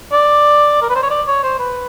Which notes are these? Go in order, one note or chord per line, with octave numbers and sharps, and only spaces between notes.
D5
A#4
B4
C5
C#5
D5
C#5
C5
B4